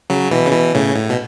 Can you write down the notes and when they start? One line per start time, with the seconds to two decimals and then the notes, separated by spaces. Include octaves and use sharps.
0.10 C#3 F#3
0.31 B2 E3
0.46 C#3
0.52 B2 E3
0.75 A2 C#3
0.96 A2
1.10 B2